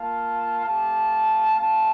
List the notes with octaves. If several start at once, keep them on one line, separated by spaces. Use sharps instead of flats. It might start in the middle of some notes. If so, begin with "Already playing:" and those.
Already playing: A#3 F4 F5 A5
A3 C4 G4 F5 A5
A3 C4 D#4 F5 A5